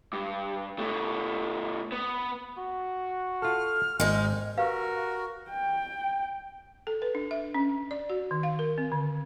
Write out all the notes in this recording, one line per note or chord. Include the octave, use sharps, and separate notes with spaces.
G2
B2 A3
B3
F#4
F4 A4 F6
G#1 G#3 D#4
F#4 G4 A#4 B4 F5
G5
A4
B4
D4
E5
C#4
D5
F#4
D#3
F5
A#4
C4
D3